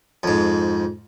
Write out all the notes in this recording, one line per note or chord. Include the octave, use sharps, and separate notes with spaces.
F2 G#2